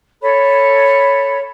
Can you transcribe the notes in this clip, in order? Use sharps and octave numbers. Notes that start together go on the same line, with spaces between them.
A4 C#5 B5